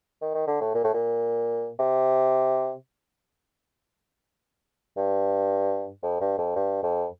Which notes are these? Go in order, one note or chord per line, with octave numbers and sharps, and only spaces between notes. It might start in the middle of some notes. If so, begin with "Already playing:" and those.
D#3
D#3
D3
A2
A#2
A2
A#2
C3
G2
F2
G2
F2
G2
F2